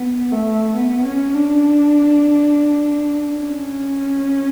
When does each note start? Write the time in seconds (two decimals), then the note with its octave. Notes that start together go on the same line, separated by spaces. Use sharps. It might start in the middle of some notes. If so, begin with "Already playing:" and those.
Already playing: B3
0.32 A3
0.76 B3
1.05 C#4
1.34 D4
3.39 C#4